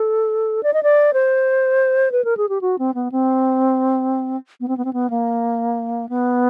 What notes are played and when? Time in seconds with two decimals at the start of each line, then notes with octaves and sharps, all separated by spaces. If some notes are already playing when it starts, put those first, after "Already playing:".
Already playing: A4
0.63 D5
0.74 D#5
0.83 D5
1.13 C5
2.12 B4
2.24 A#4
2.37 G#4
2.49 G4
2.61 F#4
2.79 C4
2.94 B3
3.12 C4
4.60 B3
4.68 C4
4.77 B3
4.85 C4
4.93 B3
5.10 A#3
6.09 B3